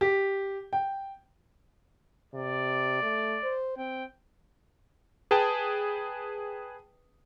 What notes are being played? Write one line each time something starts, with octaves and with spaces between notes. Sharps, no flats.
G4
G5
C3 D5
A3
C5
C4 G5
G#4 B4 G5 A5